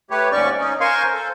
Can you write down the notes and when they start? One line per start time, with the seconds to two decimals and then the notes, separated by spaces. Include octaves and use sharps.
0.10 A3 G4 B4 C#5
0.32 D#2 G#2 C#4 D5 C#6
0.59 C#4 D#4
0.81 A#4 C5 F5 G#5 C6 C#6
1.14 A4 C5